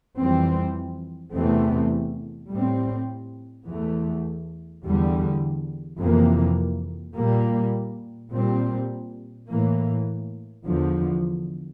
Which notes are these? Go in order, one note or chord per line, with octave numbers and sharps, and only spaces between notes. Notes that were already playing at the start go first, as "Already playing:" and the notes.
F2 E3 G3 C4
E2 C3 E3 A3 C4
A2 G3 C4
E2 E3 A3
E2 D3 G3
F2 C3 E3 A#3
A#2 G3 A#3
A#2 G3 C4
A2 E3 A#3
E2 D3 F3